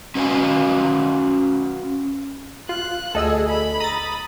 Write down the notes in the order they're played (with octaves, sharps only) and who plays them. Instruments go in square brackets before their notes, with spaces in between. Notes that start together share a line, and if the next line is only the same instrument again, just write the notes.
[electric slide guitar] C#4 F#4 B4 C5 F5 G#5
[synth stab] F4 [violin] F#6
[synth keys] D2 [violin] G#4 [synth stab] A4 D#5 E6
[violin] B5
[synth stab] A#5 [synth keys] D#6 A6